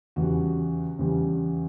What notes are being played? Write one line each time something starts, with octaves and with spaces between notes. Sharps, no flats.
E2 C#3 G3 F#4
E2 C#3 G3